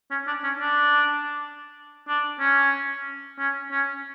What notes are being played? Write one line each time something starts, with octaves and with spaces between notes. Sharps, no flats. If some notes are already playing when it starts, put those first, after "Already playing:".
C#4
D4
C#4
D4
D4
C#4
C#4
C#4